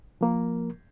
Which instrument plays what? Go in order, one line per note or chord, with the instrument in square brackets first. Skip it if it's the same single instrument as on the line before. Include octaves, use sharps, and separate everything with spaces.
[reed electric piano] F3 A#3 A#4